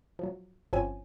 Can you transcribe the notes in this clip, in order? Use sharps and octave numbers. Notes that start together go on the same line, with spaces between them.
F3 F#3
G1 F3 C4 C#4 G#5 D#7